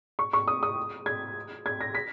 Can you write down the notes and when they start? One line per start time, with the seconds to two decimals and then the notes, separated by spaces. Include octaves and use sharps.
0.19 C#6
0.33 C#6
0.48 D#6
0.63 D#6
1.06 G#6
1.66 G#6
1.81 A#6
1.95 B6